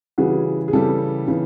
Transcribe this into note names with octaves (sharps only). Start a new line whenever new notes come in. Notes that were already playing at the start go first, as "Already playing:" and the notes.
C#3 E3 G3 F#4 G#4
G#4
C#3 E3 G3 G4 A4
C#3 E3